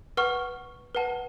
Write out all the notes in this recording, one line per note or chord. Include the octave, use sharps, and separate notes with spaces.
B4 F#5 C#6 F6
B4 F#5 A5